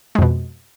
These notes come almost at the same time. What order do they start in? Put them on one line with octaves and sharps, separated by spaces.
G#3 F2 B2